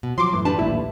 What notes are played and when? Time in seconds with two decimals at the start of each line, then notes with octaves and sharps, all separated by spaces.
0.03 B2
0.18 F3 F#3 C6 D6
0.32 F#2 A2 E3
0.45 G3 D4 B4 A5
0.59 A#1 D#2 A2 E4